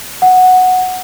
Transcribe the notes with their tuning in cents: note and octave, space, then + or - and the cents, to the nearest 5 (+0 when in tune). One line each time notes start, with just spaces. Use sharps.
F#5 -5